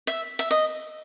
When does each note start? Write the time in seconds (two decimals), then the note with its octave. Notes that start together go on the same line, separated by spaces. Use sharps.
0.07 E5
0.39 E5
0.51 D#5